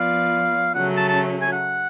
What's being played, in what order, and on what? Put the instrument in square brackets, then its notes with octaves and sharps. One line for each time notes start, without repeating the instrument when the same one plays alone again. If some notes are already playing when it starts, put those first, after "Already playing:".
Already playing: [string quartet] F3 B3 F4 B4 D5 [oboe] F5
[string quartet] C#3 F#3 A3 C#4 [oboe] F#5
[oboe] A5
A5
G#5
F#5